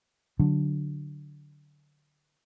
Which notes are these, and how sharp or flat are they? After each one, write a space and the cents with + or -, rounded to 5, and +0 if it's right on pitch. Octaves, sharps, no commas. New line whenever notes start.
D3 +0 F#3 +0 D4 +0